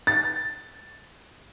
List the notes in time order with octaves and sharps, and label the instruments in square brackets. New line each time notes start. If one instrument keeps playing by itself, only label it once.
[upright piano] A6